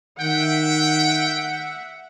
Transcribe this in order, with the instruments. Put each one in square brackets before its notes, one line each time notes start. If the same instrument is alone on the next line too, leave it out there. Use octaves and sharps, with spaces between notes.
[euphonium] D#3 [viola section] E5 F#5 [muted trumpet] G5